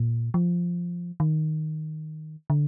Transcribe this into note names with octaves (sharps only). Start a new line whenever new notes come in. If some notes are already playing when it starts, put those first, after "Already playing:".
Already playing: A#2
F3
D#3
D3